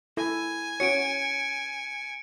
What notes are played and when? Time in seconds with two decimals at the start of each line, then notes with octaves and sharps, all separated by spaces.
0.17 E4 A4 G#5
0.80 C#4 F#4 C#5 C#7 D7